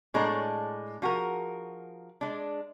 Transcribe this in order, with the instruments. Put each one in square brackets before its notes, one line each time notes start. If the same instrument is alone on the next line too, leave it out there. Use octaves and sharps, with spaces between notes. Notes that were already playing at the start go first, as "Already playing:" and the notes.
[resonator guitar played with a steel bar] A2 G#3 D4 A4 C#5 A#5
F3 F#4 G#4 A#4
G#3 D4